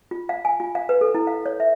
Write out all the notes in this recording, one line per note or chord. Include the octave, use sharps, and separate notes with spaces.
F4
F5
G#5
F4
F5
B4
A4
E4
F5
C#5
E5